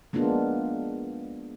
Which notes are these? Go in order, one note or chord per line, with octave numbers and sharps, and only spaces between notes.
G#3 A#3 B3 D4 F4